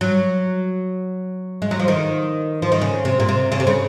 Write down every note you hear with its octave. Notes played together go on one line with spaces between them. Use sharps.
F#3
G#3
F#3
F3
D#3
F3
D#3
C#3
C3
A#2
C3
C#3
C3
C#3